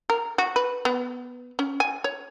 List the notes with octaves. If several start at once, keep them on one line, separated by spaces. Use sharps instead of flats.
A#4
F#4
B4
B3
C#4
G#5
C#5